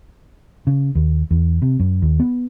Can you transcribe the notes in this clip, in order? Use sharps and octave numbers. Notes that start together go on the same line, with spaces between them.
C#3
D#2
E2
C3
F#2
D#2
B3